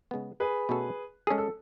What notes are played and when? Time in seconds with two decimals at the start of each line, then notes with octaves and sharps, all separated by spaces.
0.11 C#3 G#3 B3
0.40 G#4 B4
0.69 B2 A3 C#4 F#4 A4
1.27 G#4 A4
1.30 G#3 C#4
1.38 A4